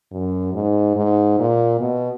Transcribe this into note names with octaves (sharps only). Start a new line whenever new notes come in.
F#2
G#2
G#2
A#2
B2